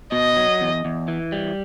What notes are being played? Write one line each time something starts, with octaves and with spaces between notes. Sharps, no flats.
B2 D#5
F#3
E2
E2
E3
G3